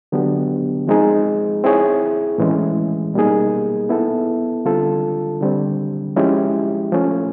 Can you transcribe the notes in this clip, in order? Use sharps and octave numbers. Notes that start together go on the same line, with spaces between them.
D3 F#3 B3 D4 G4
F3 G#3 C4 D#4 G#4
C4 E4 G#4 C#5
A2 E3 G#3 C#4
B2 G3 A#3 D#4 G#4
B3 E4 A4
D3 G3 C4 F4 A4
D3 G3 C4
F3 G#3 C#4 E4 G4
F3 A3 C#4